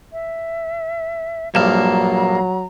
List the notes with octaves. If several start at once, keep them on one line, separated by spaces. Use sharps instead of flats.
E5
A#1 G2 F#3 A#3 A5 A#5 F6